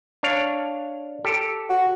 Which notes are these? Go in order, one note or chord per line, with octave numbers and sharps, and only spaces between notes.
D4 C#5 F5
G4 A4
F#4